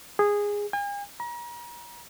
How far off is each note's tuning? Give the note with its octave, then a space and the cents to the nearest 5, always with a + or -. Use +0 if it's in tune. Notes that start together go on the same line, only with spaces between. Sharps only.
G#4 -15
G#5 -45
A#5 +40